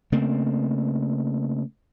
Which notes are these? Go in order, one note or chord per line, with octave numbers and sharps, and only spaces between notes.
C#3 A3 A#3 C4